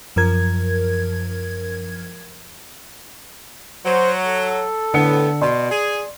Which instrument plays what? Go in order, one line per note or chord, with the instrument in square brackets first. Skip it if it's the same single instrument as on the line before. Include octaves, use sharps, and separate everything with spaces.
[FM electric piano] F#2 F3 A#4 G#6
[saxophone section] F#3 [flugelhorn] C5
[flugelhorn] A4
[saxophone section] A2 B3 [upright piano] D3 C#7
[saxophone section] B2 [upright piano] D5 C6
[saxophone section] G#4